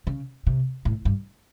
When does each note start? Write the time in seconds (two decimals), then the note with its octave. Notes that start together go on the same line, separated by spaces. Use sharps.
0.07 C#3
0.47 C3
0.85 A2
1.05 G2